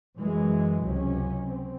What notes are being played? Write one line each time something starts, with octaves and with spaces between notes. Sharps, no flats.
F#2 E3 G#3
C#2 C3 F#3 C#4
C4